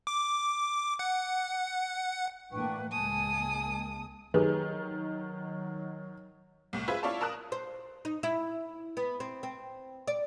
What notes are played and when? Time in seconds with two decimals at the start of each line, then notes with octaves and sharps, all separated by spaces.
0.07 D6
0.99 F#5
2.52 A2 E3 A#3 D4 B4 G5 C#6
2.92 C#2 G#3 A#3 G#5 A5 D#6
4.34 D#3 F#3 G4 G#4 B4
6.73 C2 A2
6.88 F4 G#4 B4 C5 E5
7.03 E4 F4 C#5 D5 F5 A5
7.21 A#4 A5 D#6 F#6
7.52 C5
8.05 D#4
8.23 E4
8.97 B3
9.20 C4
9.43 C4
10.07 D5